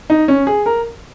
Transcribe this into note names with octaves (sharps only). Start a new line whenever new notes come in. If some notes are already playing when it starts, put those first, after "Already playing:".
D#4
C#4
G#4
A#4